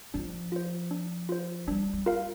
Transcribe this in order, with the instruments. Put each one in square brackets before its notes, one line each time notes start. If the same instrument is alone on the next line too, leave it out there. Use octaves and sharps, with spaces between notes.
[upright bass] F3 [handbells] D4
[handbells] F4 C5
D4
F4 C5
[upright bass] G3 [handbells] D4
[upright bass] G3
[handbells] F4 A#4 F5